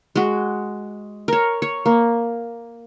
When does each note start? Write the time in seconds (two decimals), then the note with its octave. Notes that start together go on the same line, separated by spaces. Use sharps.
0.15 G#3 F#4
1.28 A#4 C#5
1.62 C#5
1.85 A#3